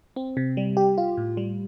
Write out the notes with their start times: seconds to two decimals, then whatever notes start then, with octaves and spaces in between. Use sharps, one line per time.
0.16 C4
0.37 C3
0.57 G3
0.77 G4
0.98 F4
1.18 A2
1.37 G3